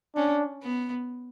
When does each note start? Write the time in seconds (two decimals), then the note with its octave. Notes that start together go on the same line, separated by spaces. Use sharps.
0.16 C#4 D4
0.63 B3